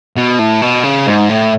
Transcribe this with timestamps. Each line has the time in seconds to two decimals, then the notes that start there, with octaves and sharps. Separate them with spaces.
0.17 B2
0.39 A2
0.62 B2
0.83 C#3
1.07 G#2
1.29 A2